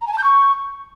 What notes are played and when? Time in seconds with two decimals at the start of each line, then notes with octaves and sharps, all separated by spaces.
0.01 A#5
0.07 G#5
0.12 A5
0.18 G6
0.24 C#6